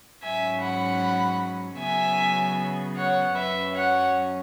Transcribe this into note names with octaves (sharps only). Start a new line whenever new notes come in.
G#2 F#3 C#4 E5 G#5
F#5 B5
C#3 F#3 B3 E5 G#5
C#5 F#5
F#2 F#3 C#4 B4 E5
C#5 F#5